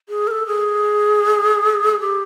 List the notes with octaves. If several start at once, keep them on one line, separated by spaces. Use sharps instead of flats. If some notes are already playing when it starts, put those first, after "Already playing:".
G#4
A#4
A4
G#4
G4